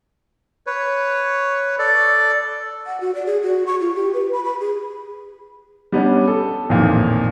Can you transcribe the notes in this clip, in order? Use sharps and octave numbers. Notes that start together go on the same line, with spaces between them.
B4 C#5
A4 D5
F#5
F#4
D5
G#4
F#4
C#6
F4
G4
B4
B5
B5
G#4
G3 B3 C#4 D4
A4
A1 F2 A#2 D#3